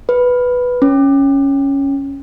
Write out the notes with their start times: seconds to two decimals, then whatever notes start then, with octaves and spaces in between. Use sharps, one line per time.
0.09 B4
0.82 C#4